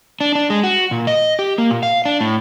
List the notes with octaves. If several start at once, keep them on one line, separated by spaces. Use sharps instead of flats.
D4
D4
G#3
F#4
A#2
D#5
G4
A#3
A#2
F5
D4
A2